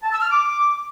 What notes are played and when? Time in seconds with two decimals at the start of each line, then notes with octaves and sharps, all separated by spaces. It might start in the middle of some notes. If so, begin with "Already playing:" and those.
0.03 A5
0.12 E6
0.21 F6
0.30 D6